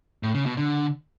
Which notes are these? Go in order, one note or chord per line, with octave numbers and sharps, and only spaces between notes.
A2
C#3
B2
D3